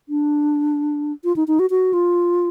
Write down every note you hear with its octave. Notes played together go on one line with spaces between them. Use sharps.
D4
F4
D#4
D#4
F#4
F#4
F4